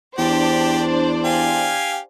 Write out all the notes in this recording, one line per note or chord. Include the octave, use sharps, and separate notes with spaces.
E2 D4 G4 C5 D5
G4 F5 G#5